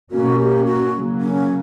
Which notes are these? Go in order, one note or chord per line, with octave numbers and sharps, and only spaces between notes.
B2 A#3 C#4 F#4
G4
F#4
C#3 F#3 A#3
C#4